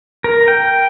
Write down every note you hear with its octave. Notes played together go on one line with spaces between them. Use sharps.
A#4
G5